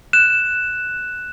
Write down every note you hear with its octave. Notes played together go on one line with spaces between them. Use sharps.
F#6 E7